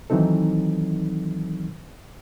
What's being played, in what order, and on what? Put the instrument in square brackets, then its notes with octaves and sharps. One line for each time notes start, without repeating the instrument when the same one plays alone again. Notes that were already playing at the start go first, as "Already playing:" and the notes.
[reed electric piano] D#3 E3 F#3 C4 D#4 A4